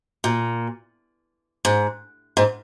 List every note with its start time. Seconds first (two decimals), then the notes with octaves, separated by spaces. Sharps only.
0.24 A#2
1.65 G#2
2.37 G#2